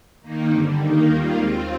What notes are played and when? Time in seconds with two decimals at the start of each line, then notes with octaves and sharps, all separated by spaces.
0.21 D#3 A#3 D#4
0.49 G2 D3 G3 C4
0.78 D#3 A#3 D#4
1.06 D#2 D#3 G3 A#3 F4
1.35 D#2 D#3 G#3 C4 F4